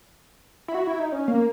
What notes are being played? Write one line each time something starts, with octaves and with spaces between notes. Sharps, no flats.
E4
F#4
E4
D#4
C#4
A#3